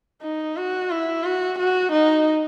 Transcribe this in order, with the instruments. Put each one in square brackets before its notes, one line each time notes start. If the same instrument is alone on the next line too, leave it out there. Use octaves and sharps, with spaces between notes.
[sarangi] D#4
F#4
E4
F#4
F#4
D#4